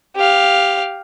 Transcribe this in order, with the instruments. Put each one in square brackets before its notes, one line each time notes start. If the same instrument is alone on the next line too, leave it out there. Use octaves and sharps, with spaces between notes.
[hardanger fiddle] G4 F5